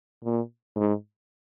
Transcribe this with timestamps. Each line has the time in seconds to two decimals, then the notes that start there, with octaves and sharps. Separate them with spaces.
0.24 A#2
0.76 G#2